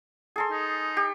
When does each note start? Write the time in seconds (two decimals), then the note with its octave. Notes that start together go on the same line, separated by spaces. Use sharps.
0.36 G#4 A4 C6
0.51 D#4
0.97 G4